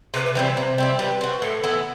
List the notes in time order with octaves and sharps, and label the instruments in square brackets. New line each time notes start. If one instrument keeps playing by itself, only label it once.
[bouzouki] C3 [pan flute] B4
[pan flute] B4
[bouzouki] E3 G3 C4 [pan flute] C5
[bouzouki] C3 [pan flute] C5
[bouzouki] G3 C4 E4
[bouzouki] G3 [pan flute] B4
[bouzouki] C4 F#4
[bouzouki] A2 [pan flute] A4
[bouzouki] E3 B3 E4